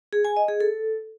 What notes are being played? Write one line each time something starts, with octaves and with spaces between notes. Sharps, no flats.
G#4
G#5
D#5
G#4
A4